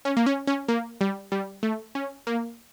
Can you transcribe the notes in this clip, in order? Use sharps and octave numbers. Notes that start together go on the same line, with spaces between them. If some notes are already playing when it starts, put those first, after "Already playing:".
C#4
A#3
C#4
C#4
A#3
G3
G3
A3
C#4
A#3